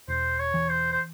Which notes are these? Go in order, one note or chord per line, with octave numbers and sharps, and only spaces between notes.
E1 C5
C#5
E3
C5
C5